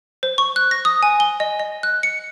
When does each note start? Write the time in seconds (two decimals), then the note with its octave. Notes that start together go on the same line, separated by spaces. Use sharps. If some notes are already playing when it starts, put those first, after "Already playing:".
0.23 C5
0.38 C#6
0.56 F#6
0.71 A#6
0.85 D#6
1.03 G#5
1.20 G7
1.40 D#5
1.60 D#5
1.83 F#6
2.03 C#7